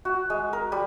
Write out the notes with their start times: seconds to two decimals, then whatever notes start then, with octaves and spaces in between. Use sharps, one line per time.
0.05 F#4
0.30 G#3
0.53 A#4
0.72 G3